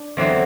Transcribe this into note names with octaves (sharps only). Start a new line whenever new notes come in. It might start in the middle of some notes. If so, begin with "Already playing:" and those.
Already playing: D4
E2 D3 F#3 C4